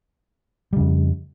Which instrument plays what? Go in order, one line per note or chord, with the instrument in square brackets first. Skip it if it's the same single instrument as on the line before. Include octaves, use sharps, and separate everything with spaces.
[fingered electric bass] G3
C#3
F2